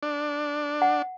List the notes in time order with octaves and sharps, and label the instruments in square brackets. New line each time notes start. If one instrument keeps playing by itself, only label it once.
[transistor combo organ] D4
[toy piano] F#5